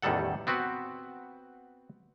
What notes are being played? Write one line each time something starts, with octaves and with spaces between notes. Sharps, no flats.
A1 E2 D#3 G3 A4 F#5
B3 C4 F#4 B4